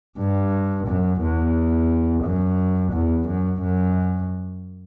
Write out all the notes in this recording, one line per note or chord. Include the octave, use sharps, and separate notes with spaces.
G2
F#2
E2
F#2
E2
F#2
F#2